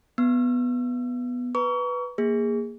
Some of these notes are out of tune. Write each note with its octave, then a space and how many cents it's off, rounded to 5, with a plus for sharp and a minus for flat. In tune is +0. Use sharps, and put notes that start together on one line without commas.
B3 +0 E6 +35
B4 +0 A#5 +15 C#6 +35
A#3 +0 G#4 -15